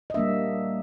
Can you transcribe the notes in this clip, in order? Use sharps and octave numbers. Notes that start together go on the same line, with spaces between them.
D#5
G3 A#3 D4 E5